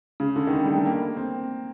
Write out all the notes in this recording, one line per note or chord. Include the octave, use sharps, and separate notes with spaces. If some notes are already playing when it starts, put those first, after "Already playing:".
C#3
D3
D#3
D3
G3
A3
A#3
C4